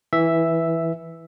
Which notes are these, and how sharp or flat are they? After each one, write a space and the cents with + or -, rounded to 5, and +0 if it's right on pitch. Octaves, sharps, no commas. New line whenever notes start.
E3 -5 E5 +0